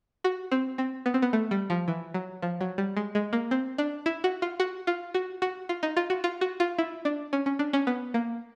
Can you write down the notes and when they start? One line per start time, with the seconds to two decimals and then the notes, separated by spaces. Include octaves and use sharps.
0.24 F#4
0.51 C4
0.78 C4
1.06 B3
1.14 C4
1.22 B3
1.33 A3
1.51 G3
1.70 F3
1.88 E3
2.14 F#3
2.42 F3
2.61 F#3
2.78 G3
2.97 G#3
3.15 G#3
3.33 A#3
3.51 C4
3.78 D4
4.06 E4
4.24 F#4
4.42 F4
4.60 F#4
4.87 F4
5.14 F#4
5.42 F#4
5.69 F4
5.83 D#4
5.97 F4
6.10 F#4
6.24 F4
6.41 F#4
6.60 F4
6.78 E4
7.05 D4
7.33 C#4
7.46 C#4
7.59 D4
7.73 C#4
7.87 B3
8.14 A#3